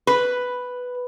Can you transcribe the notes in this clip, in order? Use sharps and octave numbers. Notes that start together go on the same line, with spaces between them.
B4